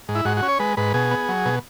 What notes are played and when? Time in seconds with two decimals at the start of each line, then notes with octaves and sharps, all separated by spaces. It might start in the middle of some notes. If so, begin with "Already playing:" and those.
0.09 G#2
0.15 E4
0.25 G#2 F#4
0.37 F#4
0.42 C#4
0.48 C#5
0.59 G#3 B4
0.77 G#2 B4
0.94 B2 G#4
1.11 B3
1.29 F#3
1.45 B2